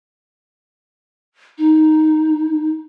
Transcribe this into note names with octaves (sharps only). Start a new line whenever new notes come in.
D#4